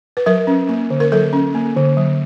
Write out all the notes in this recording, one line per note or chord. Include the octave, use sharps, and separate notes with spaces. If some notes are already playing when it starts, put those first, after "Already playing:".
B4
F#3 A#4
C#4
A#3
D3
A#4
F#3 A4
C#4
A#3
D3
F#3